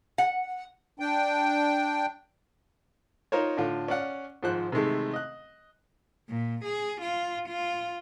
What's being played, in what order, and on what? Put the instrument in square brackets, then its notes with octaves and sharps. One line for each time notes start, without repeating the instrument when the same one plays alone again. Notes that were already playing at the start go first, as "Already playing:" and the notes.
[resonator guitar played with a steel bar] F#5
[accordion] D4 G5
[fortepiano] D#4 F4 A#4 C5 C#5
A2 D3 F4
C#4 D5 F5 F#5
G#2 D#3 F3 C5 F#6
C3 D#3 E3 G#3 A3
D#5 F#6
[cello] A#2
G#4
F4
F4